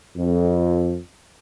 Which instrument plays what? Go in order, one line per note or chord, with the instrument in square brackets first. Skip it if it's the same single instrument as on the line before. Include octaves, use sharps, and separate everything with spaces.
[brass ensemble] F2